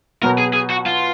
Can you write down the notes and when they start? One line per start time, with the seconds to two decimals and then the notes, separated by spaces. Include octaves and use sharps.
0.23 B2 F#3 B3 A#4
0.38 G#4
0.54 G#4
0.70 F#4
0.86 F4